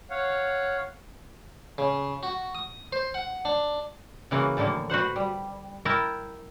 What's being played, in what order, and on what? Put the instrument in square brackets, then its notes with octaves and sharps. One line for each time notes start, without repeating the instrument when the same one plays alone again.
[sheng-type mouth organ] C#5 F5 F#5
[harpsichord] C#3
F#4
D#6
C5
F#5
D4
[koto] C#3 E3 A#3 F4 F#4
A2 D3 E3 F3 A#3
F#4 B4 C5 F#5
G3
E4 A#4 G5 A5